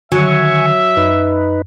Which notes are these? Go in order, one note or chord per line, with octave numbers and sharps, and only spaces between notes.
D3 D#3 F#3 E5 G#5 C#6
F#2 D#4 B4